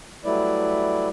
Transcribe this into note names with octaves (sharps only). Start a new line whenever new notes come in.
F#3 G3 A3 E4 B4 D5